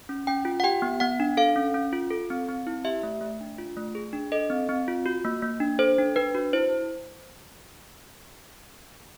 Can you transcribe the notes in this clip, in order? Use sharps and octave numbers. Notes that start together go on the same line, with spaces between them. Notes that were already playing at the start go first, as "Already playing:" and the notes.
C#4
C#4 G5
F4
F#5
G4 G5
B3
B3 F#5
D4
A4 F5
C#4
C#4
F4
A4
C4
C4
E4
G4 E5
A3
A3
D4
F4
A3
G#4
D4
A4 D#5
C4
C4
F4
F#4
A#3
A#3
D4
A4 C5
D4
D4 B4
F#4
E4 C5